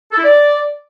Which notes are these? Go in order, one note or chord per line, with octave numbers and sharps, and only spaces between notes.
A4
E4
D5